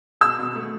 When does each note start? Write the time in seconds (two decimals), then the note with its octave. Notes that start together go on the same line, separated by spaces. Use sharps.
0.21 B2 E6
0.39 B2
0.56 A3